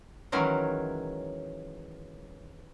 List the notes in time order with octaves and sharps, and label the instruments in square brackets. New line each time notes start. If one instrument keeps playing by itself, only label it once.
[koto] D#3 E3 F#3 G#3 C#4 A#4